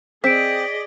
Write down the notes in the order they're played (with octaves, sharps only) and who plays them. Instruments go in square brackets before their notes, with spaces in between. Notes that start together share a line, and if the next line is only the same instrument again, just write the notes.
[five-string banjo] C4 [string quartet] G#4 D5 D#5 [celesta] B6 D7